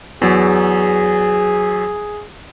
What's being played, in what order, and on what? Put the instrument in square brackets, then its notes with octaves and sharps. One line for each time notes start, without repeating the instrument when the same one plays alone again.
[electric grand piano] E2 F#3 [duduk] G#4